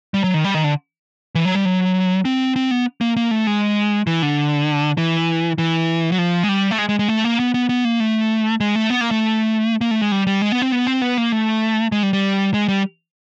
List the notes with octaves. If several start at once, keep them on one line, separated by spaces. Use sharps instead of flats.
G3
F#3
D#3
G3
D#3
D3
E3
F#3
G3
F#3
C4
C4
B3
A#3
A#3
A3
G#3
E3
D3
E3
E3
F#3
F3
G#3
G3
A3
G#3
G#3
G#3
A3
A#3
B3
B3
B3
A#3
A3
G#3
A3
B3
A#3
A3
A#3
A3
G#3
G3
G3
G#3
B3
C4
B3
C4
B3
A#3
A3
G#3
G3
G3
G#3
G3